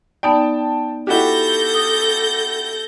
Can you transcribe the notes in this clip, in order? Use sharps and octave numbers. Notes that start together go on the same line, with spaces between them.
B3 D#4 D5 G5 A5
E4 F#4 G4 A4 G6 A#6
D#6